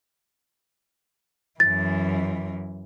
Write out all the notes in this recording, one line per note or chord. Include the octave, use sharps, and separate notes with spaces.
F#2 E3 A6